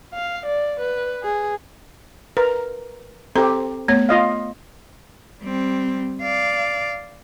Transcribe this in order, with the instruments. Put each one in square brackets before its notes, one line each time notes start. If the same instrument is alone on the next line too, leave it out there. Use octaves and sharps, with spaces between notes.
[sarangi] F5
D5
B4
G#4
[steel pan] A#4 [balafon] B4
[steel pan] C4 G4 [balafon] A4 A#5
[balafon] A3 B3 C#5
[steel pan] F4 D#5 F5
[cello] G3 C4
D5 F5